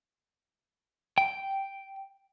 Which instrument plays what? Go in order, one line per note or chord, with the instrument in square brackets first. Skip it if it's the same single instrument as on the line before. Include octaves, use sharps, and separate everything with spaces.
[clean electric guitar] G5